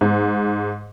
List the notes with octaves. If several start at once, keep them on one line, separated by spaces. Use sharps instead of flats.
G#2